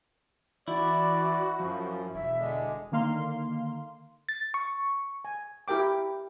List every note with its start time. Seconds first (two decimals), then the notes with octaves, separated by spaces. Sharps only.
0.68 E3 E4 F#4 D5
1.60 F#2 F3
2.14 E1 E5
2.39 D3 G#3
2.92 D3 D#3 A#3 F5 C6
4.29 A6
4.54 C#6
5.25 G#5
5.68 E4 G4 A#4 G5 D6